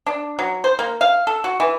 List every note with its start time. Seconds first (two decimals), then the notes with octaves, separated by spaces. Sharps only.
0.06 D4
0.39 F#3
0.64 C5
0.79 A#3
1.01 F5
1.27 A4
1.44 F#4
1.60 E3